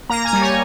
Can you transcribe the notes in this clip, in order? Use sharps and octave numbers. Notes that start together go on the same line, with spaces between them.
A#3 A#5
G#5
G3
C#5